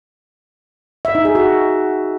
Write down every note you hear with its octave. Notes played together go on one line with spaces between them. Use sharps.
E5
D#4
G#4
F#4